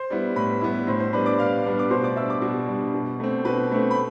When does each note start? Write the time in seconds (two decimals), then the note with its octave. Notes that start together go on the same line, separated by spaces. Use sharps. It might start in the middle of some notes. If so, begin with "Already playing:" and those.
Already playing: C5 C6
0.10 G3 B3 E4
0.36 A2 B4 B5
0.61 G3 B3 E4
0.87 A2 C5 C6
1.00 C5 C6
1.13 G3 B3 D4 B4 B5
1.26 D5 D6
1.39 A2 F5 F6
1.65 G3 B3 D4
1.79 D6
1.90 B2 C5 C6
2.04 D5 D6
2.16 G3 D4 E5 E6
2.29 D5 D6
2.42 B2
2.68 G3 D4
2.94 B2
3.20 A3 C4
3.45 B2 B4 B5
3.72 A3 C4
3.91 B5